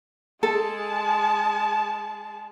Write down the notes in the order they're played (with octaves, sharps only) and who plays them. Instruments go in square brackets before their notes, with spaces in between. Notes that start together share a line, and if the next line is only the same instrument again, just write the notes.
[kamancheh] G#3 A5 [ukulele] A4